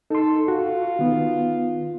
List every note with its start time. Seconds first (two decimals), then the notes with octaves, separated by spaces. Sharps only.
0.10 D#4 A4 C6
0.48 F4 F#4
0.99 D#3 B3